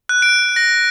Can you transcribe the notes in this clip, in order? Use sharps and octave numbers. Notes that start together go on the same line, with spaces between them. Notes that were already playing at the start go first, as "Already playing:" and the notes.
F#6
D7
A#6